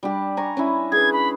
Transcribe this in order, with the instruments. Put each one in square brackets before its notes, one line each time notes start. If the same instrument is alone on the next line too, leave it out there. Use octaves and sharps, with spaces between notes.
[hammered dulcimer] G3 D4 G4
G#5 A#5 C#6
C#4 D4 E4
[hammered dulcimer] G#4 B4 [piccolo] G#6
[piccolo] B5